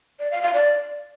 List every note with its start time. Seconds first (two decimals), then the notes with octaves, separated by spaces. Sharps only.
0.20 D5
0.31 F5
0.42 F5
0.54 D5